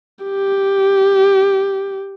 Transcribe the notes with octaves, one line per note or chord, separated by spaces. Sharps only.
G4